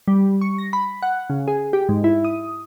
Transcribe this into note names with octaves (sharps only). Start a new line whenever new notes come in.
G3
C#6
A#6
B5
F#5
C#3
G#4
G4
G#2
E4
D#6